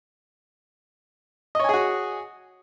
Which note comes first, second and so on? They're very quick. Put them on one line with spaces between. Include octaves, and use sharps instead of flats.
D#5 C#5 G#5 G#4 F#4